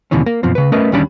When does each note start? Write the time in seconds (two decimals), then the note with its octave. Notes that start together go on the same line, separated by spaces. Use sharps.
0.11 D#2 B2 D3 E3 C#4
0.26 A#3
0.43 F#2 B2 F3 C4
0.55 C#3 B4
0.72 A3 C#4 A#4 B4 D#5 E5
0.92 D2 D#3 G3 C#4 D4 B5